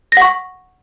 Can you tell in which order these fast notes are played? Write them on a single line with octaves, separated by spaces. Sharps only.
A#6 F#5 C#6